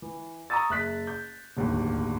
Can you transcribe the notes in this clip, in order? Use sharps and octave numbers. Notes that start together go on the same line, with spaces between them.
E3
A#5 C#6 D#6 E6 A6
F#1 E5 F#6 B6
G6
D1 G1 D#2